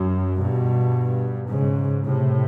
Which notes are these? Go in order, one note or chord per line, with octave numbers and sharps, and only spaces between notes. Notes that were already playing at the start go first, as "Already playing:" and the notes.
Already playing: F#2
G2 B2
G#2 C#3
A2 C3